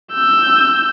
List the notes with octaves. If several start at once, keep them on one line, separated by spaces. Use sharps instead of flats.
E6 G6